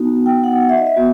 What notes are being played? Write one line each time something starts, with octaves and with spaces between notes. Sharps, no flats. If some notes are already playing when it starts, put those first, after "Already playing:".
Already playing: B3 D#4 F#4
G5
F#5
F#5
E5
D#5
E5
B3 F#4